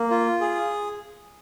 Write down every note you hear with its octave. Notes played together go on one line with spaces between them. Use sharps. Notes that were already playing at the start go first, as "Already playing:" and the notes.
Already playing: A#3
F4
G#4